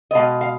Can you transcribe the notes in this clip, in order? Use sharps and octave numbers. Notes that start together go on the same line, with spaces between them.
D#5
B2 G#3 F5
F5